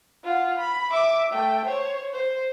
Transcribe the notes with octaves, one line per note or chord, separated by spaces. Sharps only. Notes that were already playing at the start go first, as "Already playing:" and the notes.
F4 F#5
B5
E5 D6
A3 G5
C5 C#5
C5